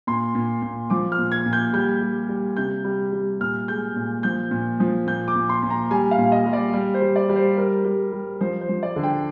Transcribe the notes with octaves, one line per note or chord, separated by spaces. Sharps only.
A#2 C6
A#2
A#2
F3 D6
F6
A#2
G#6
A#2
G6
G3 G6
G3
G3
C3 G6
G3
G3
A#2 F6
G#3 G6
A#2
F3 G6
A#2
F3
A#2 G6
D6
A#2
C6
A#2
A#5
G3 G#5
F5
A#2
D#5
G3
D5
G3
C5
G3
D5
G3
C5
G3 A#4
G3
G3
F3 C5
C5
F3
D5
D3
G5